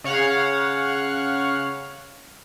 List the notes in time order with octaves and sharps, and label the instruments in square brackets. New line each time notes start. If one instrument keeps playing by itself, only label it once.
[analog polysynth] C#3 C#5 F5 F#5